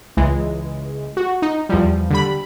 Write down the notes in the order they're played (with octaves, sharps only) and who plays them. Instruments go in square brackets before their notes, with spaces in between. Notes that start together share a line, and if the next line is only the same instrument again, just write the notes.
[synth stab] C#2 E3 G#3
F#4
D#4
E2 F3 G3
D3 G3 B5